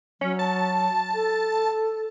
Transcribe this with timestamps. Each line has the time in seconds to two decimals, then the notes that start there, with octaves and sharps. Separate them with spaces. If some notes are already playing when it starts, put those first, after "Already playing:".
0.21 F#3 C#4
0.39 A5
1.15 A4